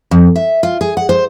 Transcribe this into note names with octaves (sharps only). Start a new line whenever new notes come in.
F2
E5
F4
G#4
F#5
C5